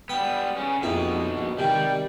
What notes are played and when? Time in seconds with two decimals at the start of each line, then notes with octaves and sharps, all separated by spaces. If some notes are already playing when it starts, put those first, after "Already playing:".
0.09 G3 B3 G5
0.56 C#3 C#4
0.83 A#1 F2 B2 D#4 E4
1.38 A#1
1.59 C3 D#3 G3 G5